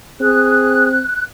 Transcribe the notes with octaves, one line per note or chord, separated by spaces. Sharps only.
C4 G#4 F#6